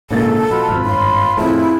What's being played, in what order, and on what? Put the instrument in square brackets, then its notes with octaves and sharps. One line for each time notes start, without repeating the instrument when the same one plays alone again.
[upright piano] A#1 A#3 A6 [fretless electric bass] G#2 C#3 [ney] A4
[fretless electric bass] B2 [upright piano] F3 [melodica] F4 B4 B5
[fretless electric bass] G#1 [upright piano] F2 F6
[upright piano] G1 [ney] C6
[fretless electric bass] F2 A2 [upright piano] C4 G#4 A5 [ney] E4